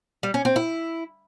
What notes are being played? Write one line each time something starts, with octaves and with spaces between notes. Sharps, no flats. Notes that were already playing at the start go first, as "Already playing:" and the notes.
G3
C#4
C4
E4